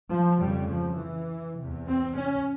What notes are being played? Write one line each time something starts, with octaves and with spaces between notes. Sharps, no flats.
F3
F2 C#3 G3
F3
E3
E2 C3
C4
C#4